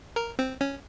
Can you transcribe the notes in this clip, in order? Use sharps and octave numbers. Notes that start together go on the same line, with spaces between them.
A#4
C4
C#4